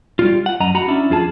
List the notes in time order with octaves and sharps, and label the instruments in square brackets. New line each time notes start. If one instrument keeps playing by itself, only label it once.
[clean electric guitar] G3 F4
F#5
F#2 D#5 A#5
F#4 F#5 A#5 B5
C#4 D4 E4
F2 F4 G#4 A5